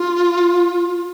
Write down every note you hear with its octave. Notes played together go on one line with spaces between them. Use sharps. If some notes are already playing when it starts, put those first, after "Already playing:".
Already playing: F4